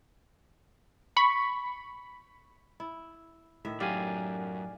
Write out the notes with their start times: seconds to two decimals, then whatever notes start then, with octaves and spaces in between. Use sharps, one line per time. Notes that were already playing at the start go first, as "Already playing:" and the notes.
1.17 B5 C#6
2.80 E4
3.65 A2 D#3 E5
3.80 F#2 G4 D5 F5 G#5